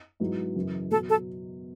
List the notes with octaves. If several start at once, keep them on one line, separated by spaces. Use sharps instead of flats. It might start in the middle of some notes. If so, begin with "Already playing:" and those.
G#2 F#3 B3 E4
F#2 C#3 E3
B2 F#3 B3 A4
A4